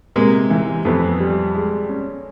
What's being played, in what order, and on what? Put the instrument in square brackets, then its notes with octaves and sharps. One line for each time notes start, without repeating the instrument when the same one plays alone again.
[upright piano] C3 [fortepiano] G#3 A#3
[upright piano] E3
[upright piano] F2 [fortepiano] A3 B3
[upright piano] G3
G#3
C#4